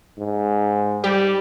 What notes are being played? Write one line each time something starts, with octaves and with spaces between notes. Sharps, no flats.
G#2
G3 G4